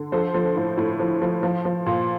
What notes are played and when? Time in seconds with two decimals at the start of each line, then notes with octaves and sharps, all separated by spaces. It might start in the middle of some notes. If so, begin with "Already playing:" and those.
Already playing: D3
0.12 F3 A4 C5
0.34 F3
0.56 A2
0.77 A2
1.00 F3
1.22 F3
1.43 F3
1.65 F3
1.86 A#2